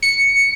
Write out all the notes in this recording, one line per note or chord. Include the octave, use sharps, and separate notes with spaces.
C#7